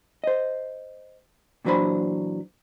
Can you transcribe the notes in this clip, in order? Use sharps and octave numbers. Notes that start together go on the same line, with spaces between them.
C5 D#5
A#2 E3 F#3 D4 C5 B5